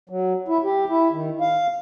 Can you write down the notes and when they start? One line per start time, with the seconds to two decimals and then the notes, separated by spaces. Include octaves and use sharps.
0.10 F#3
0.48 E4
0.64 G4
0.89 E4
1.12 D#3
1.40 F5